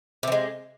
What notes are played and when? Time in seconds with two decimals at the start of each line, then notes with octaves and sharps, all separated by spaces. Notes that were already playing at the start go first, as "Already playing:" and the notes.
0.23 C3
0.27 E3
0.32 G#3